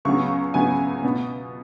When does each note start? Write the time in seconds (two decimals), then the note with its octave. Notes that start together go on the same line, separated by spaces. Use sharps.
0.05 C#2 C#3 F#3 B3 C#6
0.54 C#2 C#3 F#3 B3 G#5
1.04 B2 B3